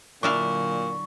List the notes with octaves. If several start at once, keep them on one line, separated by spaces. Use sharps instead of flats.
A#2 D3 F#3 D4 E4 F5 C#6